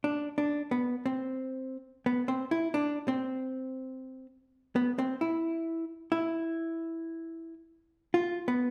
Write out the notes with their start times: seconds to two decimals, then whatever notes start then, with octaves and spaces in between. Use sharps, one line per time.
0.04 D4
0.38 D4
0.71 B3
1.06 C4
2.06 B3
2.28 C4
2.51 E4
2.74 D4
3.08 C4
4.76 B3
4.99 C4
5.21 E4
6.12 E4
8.14 F4
8.48 B3